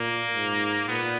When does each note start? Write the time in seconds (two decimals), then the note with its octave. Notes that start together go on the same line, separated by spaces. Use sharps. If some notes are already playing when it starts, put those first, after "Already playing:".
Already playing: A#2 A#3
0.33 G#2
0.88 A#2 B3